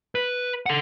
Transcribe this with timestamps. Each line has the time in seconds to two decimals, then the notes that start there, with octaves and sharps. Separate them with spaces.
0.15 B4
0.66 A4 F#5